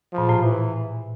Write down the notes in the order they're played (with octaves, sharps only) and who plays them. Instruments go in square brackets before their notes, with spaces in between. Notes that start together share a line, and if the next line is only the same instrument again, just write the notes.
[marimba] A#2 [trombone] F3
[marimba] A2
[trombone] E3